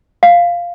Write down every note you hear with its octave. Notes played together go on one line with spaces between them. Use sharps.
F5